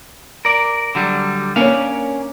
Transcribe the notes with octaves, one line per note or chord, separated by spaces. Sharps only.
A#4 D5
D3 F#3 G3
A#3 C#4 D4 C#5 F5